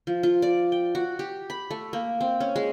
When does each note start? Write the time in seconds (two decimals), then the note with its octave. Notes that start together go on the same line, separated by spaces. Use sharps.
0.07 F3
0.23 F4
0.42 D5
0.72 G5
0.95 F#4
1.19 G4
1.50 B5
1.71 A3
1.93 A#3
2.21 C4
2.40 C#4
2.56 G#3